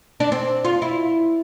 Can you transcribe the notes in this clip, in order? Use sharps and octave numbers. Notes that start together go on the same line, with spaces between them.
D4
C4
F4
E4